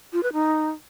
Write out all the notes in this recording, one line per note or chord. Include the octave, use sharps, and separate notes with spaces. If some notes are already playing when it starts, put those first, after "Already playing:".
F4
B4
D#4